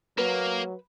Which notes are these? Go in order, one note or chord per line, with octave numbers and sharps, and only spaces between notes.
F#3 A#3 B4